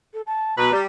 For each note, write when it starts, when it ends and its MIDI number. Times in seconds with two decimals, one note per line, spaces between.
0.14 0.22 69
0.27 0.58 81
0.58 0.69 47
0.58 0.69 71
0.58 0.77 82
0.72 0.86 55